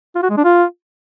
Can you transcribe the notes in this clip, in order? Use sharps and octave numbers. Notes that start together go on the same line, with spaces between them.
F4
F#4
G#3
D4
F4